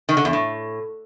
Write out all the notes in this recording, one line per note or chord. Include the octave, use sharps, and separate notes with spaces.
D#3
D3
E2
A2